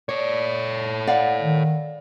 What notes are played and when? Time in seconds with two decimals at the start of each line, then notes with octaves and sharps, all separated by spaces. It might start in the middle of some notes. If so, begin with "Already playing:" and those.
0.09 A4 C#5 D5
1.07 D5 F5 F#5
1.42 D#3